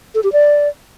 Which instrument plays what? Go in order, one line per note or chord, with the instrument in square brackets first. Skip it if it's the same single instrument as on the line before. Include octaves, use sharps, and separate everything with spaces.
[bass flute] A4
G4
D5